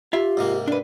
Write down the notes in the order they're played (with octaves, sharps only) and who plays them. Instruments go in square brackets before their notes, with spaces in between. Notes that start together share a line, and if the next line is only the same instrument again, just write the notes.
[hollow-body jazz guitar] F4 E5 [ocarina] G4
[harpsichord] G#2 C3 A#3
[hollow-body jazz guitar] D4 B4